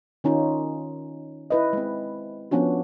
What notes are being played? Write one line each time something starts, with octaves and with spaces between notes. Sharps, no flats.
D#3 C#4 D#4 F4
E4 B4 D#5
G#3 C4
F3 B3 C#4 D4 F#4